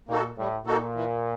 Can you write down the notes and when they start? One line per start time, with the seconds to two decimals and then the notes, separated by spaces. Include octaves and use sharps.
0.09 A#2 A#3 D#4 F#4 A4
0.38 A2 G3
0.66 A#2 A#3 D#4 F#4 A4
0.95 E3